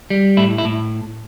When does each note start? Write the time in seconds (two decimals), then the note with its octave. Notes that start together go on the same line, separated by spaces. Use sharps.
0.10 G3
0.37 A2 E4
0.58 E4
0.65 A2